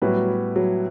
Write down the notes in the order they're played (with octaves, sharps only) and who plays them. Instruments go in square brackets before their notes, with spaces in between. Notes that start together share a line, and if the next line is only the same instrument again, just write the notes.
[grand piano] A2 G3 B3 F#4 B4 [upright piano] F#3
[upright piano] F#3